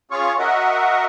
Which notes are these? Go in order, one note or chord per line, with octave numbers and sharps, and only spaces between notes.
C#4 F4 G#4 C#5 F5 C#6
F#4 A#4 D#5 E5 F#5